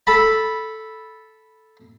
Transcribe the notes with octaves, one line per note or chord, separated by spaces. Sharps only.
A4 A5 B5